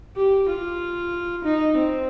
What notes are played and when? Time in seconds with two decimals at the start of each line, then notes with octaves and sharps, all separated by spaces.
0.16 G4
0.49 F4
1.44 D#4
1.77 C4